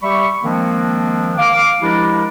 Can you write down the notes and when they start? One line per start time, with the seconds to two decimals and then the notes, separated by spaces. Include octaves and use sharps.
0.03 G3 G4 E5 B5 C#6
0.43 D#3 F3 G#3 A#3 C4 D4
1.39 F5 D6
1.82 F3 G#3 D4 E4 G4 A#4